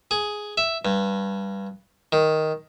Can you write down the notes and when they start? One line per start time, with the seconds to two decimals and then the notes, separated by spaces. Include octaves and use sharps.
0.11 G#4
0.58 E5
0.85 G2
2.12 D#3